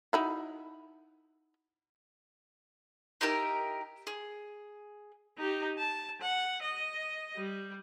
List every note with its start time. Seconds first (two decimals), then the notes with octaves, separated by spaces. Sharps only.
0.13 D#4 E4 F#4
3.21 D#4 E4 G4 A#4
4.07 G#4
5.38 D#4 G4
5.78 A5
6.21 F#5
6.62 D#5
7.36 G3